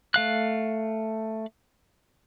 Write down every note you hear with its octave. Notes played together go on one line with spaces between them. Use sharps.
A3 F5 F#6